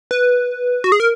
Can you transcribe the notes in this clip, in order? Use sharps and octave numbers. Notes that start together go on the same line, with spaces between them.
B4
F#4
G#4
A#4